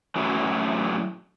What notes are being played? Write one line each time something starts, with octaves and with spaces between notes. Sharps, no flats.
F#2 A2 E3 F#3